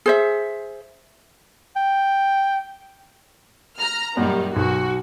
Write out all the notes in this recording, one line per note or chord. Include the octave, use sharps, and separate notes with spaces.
G#4 C5 E5
G5
A#5 F6
F#2 A#2 D#3 G3
B1 F#4